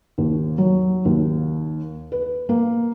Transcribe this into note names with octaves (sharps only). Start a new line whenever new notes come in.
D#2
F#3
D#2
B4
A#3